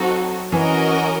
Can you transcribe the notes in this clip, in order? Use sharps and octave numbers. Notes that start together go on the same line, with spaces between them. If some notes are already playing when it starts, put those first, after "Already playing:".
Already playing: F#3 C4 D#4 F#4 A4
E3 C#4 F#4 A#4 D#5